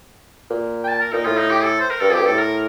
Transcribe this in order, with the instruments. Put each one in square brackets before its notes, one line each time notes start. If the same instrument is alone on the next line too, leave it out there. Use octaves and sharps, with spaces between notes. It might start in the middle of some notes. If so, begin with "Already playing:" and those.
[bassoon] A#2
[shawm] G5
A5
A#4
[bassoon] A#2 [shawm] D#4
[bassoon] A2 [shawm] F4
[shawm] D#4
G4
A4
C5
A#4
[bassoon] G2 [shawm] A4
[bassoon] F2
[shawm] G4
[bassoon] G2
[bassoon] A2 [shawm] A4
[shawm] A#4